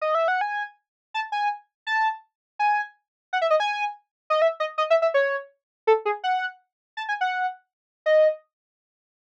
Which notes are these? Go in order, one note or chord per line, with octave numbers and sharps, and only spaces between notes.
D#5
E5
F#5
G#5
A5
G#5
A5
G#5
F#5
E5
D#5
G#5
D#5
E5
D#5
D#5
E5
E5
C#5
A4
G#4
F#5
A5
G#5
F#5
D#5